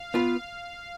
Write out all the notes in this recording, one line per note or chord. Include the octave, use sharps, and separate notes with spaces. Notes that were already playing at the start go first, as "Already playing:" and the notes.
Already playing: F5
B3 F4 B4 F5